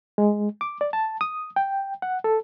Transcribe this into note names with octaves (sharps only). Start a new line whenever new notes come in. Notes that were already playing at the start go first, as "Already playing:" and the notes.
G#3
D6
D5
A5
D#6
G5
F#5
A4